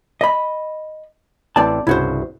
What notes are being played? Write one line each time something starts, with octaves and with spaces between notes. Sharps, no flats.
D#5 B5
A1 E3 C4 D5 A5
C2 G2 C#3 E4 F#4 C5